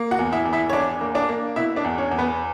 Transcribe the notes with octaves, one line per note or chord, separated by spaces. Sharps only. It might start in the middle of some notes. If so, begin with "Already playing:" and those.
Already playing: A#3
F#4 F#5
E2
E4 E5
E2
E4 E5
C#5
E2 D4 D5
A#3
D4 D5
A#3
B2 E4 E5
D4 D5
E2
C#4 C#5
E2
B3 B4